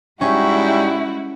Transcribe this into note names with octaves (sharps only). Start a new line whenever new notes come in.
G#2 G3 G#3 C#4 E4 F#4 E5 G5